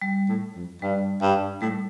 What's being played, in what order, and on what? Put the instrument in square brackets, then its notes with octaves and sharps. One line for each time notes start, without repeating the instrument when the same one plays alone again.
[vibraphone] G3
[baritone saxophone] A2
F2
[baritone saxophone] G2 [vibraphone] G3
[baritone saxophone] G2
[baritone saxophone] A2 [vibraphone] G3